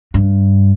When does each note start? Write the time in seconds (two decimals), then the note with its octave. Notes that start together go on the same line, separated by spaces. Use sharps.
0.14 G2